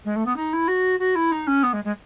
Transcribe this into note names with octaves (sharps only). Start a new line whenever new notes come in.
G#3
A3
B3
D#4
E4
F#4
F#4
E4
D#4
C#4
B3
G#3
G#3